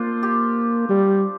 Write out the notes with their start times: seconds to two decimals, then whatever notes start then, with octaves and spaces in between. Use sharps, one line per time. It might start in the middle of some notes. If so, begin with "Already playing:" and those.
Already playing: A#3 C4 D4 F4 C5
0.23 G4
0.89 G3